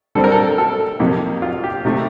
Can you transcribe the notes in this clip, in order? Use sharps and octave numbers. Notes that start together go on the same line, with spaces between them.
D3 G3 C4 A4
A#4
A4
A4
F2 C3 D#3 A#3
F4
G4
C3 D#3 A3